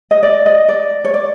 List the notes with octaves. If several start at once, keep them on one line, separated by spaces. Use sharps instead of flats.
D#5
D5
D#5
D5
C#5
D5